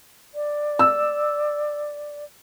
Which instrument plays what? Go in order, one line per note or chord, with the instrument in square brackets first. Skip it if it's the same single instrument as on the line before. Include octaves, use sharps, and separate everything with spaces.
[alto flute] D5
[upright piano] E6